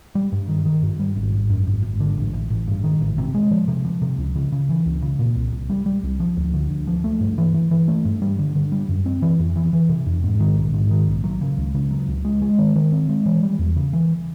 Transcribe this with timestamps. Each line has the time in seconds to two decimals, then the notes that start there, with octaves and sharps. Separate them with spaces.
0.15 G3
0.32 G2
0.48 D#3
0.65 D#3
0.83 G2
0.99 G3
1.16 G#1
1.33 G#1
1.50 F#2
1.67 G#1
1.83 G#1
2.00 D3
2.17 A1
2.33 A1
2.50 A1
2.67 G2
2.84 D#3
3.01 A1
3.18 C3
3.35 G#3
3.51 F3
3.68 C3
3.85 F3
4.02 C3
4.18 C#2
4.35 C#3
4.52 C#3
4.69 E3
4.86 C#2
5.02 C#3
5.19 A#2
5.36 C2
5.52 C2
5.69 G3
5.86 G3
6.03 C2
6.20 F3
6.37 D2
6.54 D3
6.70 D2
6.87 F3
7.04 A3
7.21 G2
7.38 E3
7.54 E3
7.71 E3
7.88 A3
8.05 G2
8.22 G3
8.39 D3
8.55 D3
8.72 G3
8.89 F#2
9.06 C4
9.22 E3
9.39 F2
9.56 E3
9.73 E3
9.89 C3
10.06 F2
10.24 G#2
10.40 D#3
10.57 A#1
10.74 G#2
10.90 D#3
11.08 A#1
11.24 F#3
11.41 C#3
11.58 C#2
11.75 C#3
11.91 F#3
12.08 C#2
12.25 G#3
12.42 G#3
12.59 D#3
12.76 D#3
12.92 C4
13.09 G#3
13.26 E3
13.43 G3
13.59 E2
13.76 C#3
13.93 E3